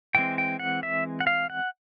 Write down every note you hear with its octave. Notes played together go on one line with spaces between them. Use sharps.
E3 G#3 C4 G5
G5
F#5
E5
F#5
F5
F#5